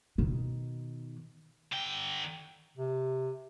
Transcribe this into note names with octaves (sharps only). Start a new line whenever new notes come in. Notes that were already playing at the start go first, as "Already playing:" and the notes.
B2 D#3
D3 G5
C3